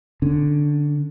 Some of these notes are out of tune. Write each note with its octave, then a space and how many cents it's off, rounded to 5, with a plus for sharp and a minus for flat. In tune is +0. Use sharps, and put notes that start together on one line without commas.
D3 +0 C#4 +0